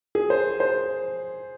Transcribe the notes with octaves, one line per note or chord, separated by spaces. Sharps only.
G#4
C5
C5